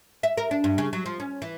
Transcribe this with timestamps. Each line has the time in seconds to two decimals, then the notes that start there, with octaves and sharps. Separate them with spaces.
0.23 E5
0.37 A#4
0.51 D4
0.64 G2
0.78 C#3
0.93 F#3
1.06 F3
1.20 C#4
1.42 E3